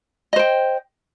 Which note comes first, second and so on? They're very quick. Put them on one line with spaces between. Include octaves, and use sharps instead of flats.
D#5 C5 G5